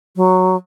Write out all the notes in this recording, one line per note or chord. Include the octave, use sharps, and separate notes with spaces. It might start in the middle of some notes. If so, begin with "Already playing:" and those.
F#3